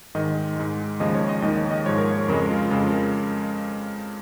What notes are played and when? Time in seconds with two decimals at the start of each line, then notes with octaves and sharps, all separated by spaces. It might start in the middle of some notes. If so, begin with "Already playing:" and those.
0.15 G#2 D#3 G#3 D#5
0.57 G#2 G#3
1.00 D#2 C#3 F3 G#3 D#5
1.15 C#5
1.29 D#5
1.42 D#2 D#3 G#3 D#5
1.57 C#5
1.71 D#5
1.86 G#2 F3 G#3 C#5
1.98 A#4
2.12 C#5
2.28 F2 C#3 G#3 A#4
2.50 F4
2.70 F2 C#3 G#3 F4
2.93 A#4